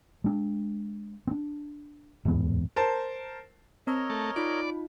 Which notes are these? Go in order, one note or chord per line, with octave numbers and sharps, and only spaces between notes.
G#3 D4
C4 D4
D1 E2 G#2 B3
A#4 C5 A5
C4 A#4 C#5 D#5 A5 E6
A3
D#4 F4 D5 B5